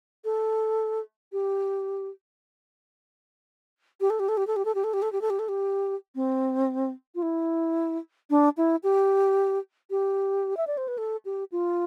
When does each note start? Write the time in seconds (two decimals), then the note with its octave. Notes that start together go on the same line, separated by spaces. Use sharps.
0.25 A4
1.32 G4
4.01 G4
4.10 A4
4.20 G4
4.29 A4
4.37 G4
4.47 A4
4.56 G4
4.65 A4
4.75 G4
4.84 A4
4.93 G4
5.02 A4
5.12 G4
5.21 A4
5.30 G4
5.39 A4
5.49 G4
6.15 C4
7.15 F4
7.22 E4
8.30 D4
8.57 E4
8.83 G4
9.90 G4
10.57 E5
10.67 D5
10.77 C5
10.88 B4
10.98 A4
11.25 G4
11.52 F4